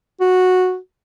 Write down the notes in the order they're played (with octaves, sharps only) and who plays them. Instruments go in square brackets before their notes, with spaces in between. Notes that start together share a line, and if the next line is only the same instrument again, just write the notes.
[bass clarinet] F#4